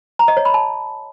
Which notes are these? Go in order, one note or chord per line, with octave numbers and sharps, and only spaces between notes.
A#5
D#5
C#5
B5
A5